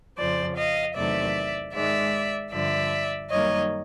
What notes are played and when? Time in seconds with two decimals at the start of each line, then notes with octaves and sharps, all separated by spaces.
0.17 F2 C#3 F3 C5 D5
0.57 D#5 F5
0.95 E2 C3 D#3 F#3 A3 D5 E5
1.74 G#2 D#3 G#3 D5 E5
2.52 G2 D3 F3 D5 E5
3.30 F#2 D#3 G3 A#3 C#5 D#5